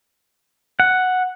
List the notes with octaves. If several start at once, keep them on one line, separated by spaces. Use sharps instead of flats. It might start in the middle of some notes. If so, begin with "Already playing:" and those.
F#5